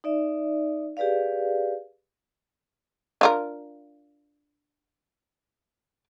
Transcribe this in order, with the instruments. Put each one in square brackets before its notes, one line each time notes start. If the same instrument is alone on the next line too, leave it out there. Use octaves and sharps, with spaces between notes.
[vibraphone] D#4 D5 E5
G4 G#4 B4 D5 F5
[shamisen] D4 F4 A#4